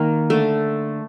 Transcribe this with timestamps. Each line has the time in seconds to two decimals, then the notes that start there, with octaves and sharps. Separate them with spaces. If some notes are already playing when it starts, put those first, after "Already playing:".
Already playing: D#3 A#3
0.30 D3 A3